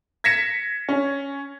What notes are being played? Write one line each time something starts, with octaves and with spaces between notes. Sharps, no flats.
G#6 A#6 B6 C#7 E7
C#4